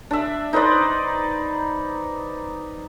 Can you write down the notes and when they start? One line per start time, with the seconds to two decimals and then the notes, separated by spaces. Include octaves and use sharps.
0.11 D4 E5
0.53 D#4 B4 C5 D5